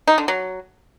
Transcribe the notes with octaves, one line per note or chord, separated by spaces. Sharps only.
D#4
D3
F#3